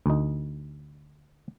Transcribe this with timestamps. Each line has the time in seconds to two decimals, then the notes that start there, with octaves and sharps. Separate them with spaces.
0.06 D2 D#4